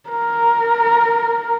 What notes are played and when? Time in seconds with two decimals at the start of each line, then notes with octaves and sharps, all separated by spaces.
0.10 A#4